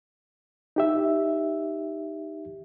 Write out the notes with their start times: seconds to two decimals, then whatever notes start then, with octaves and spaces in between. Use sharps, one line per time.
0.76 D#4 G4 E5